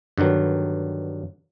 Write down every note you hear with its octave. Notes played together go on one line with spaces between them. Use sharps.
G2 D3 D#3 F#3 B3